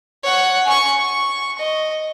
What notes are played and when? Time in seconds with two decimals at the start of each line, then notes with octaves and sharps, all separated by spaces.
0.23 C#5 F#5
0.65 G#5 C#6
0.99 C#6
1.58 D#5